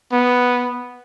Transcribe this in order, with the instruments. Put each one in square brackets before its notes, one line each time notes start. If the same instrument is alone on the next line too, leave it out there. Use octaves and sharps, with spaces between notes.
[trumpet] B3